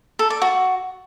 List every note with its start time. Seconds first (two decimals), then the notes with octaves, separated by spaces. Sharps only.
0.19 A4
0.30 D5
0.42 F#4